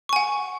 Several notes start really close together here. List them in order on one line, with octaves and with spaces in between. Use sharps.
C#6 G#5 F#5